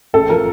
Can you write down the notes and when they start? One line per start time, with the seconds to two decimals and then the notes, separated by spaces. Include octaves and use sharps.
0.14 A1 A4
0.29 F3 A#4